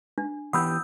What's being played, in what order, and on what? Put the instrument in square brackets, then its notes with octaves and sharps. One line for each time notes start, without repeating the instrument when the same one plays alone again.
[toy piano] D4
[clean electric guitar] E3 B3 G4 [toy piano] F#5 B5 [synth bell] D#6 E6 G6